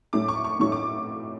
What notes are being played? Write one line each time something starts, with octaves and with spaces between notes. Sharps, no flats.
A2 F#3 A3 C#4 D6
C#6
C#6
A2 F#3 A3 C#4 C#6
D6